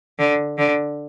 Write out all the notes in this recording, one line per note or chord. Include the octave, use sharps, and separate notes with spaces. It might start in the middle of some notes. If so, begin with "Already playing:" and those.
D3
D3